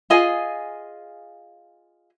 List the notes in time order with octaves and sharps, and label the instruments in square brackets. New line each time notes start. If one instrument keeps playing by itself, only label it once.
[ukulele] F4 G#4 D#5 G#5